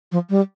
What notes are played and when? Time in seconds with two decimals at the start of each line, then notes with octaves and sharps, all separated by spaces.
0.12 F3
0.30 G3